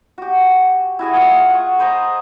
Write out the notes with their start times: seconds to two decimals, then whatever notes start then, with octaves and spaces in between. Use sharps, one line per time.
0.18 F#4 G4
0.99 E4 F#4 G#4 E5
1.13 F4 G#4
1.50 F#5 C#6
1.79 B4 C5 D#5 A#5